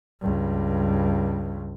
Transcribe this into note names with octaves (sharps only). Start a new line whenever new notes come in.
C#2 G2